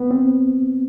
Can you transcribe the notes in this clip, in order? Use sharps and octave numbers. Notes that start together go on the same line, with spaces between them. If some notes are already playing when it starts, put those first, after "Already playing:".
Already playing: B3
C4